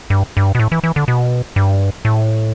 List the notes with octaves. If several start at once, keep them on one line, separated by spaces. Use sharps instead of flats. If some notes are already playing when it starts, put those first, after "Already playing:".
G2
G2
B2
A2
E3
E3
D3
B2
G2
A2